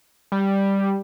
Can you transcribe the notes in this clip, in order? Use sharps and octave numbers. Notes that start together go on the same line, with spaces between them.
G3